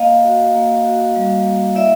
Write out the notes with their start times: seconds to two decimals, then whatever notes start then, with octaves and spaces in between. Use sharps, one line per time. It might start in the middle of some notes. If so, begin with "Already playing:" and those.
Already playing: A#3 D#5 F5
0.24 F#4
0.55 A#3
0.85 F#4
1.16 G3
1.46 A#3
1.75 E4 D5 E5